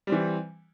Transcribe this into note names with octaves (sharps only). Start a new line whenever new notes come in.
E3 G3 C4